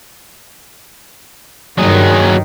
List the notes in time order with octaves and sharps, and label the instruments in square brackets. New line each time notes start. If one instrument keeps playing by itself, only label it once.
[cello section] G2 D#3 [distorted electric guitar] F#3 G#4